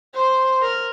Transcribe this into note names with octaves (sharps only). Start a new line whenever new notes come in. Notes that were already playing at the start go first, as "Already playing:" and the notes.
C5
A#4